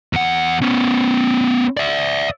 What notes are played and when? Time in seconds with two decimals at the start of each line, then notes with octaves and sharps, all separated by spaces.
0.13 E2 F#5
0.62 B3 C#4
1.77 D5 E5